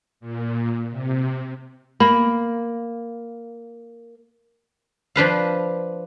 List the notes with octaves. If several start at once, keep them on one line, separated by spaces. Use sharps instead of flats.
A#2
C3
A#3 B5
F3 D4 B4 F5